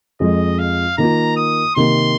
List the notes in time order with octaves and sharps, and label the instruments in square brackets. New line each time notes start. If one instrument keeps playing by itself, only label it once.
[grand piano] F2 F3 G#3 [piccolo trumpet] D#5
[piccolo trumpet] F5
[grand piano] D#3 A#3 F4 [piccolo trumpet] A#5
[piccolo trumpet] D#6
[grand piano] C3 D#3 A#3 [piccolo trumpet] C6